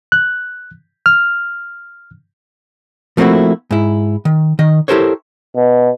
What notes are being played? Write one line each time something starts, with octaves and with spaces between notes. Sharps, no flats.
F#6
F6
F3 A3 A#3 C4 E4 F#4
G#2 E4
D#3
D#3 D#5
E4 G4 A4 A#4 C5 C#5
B2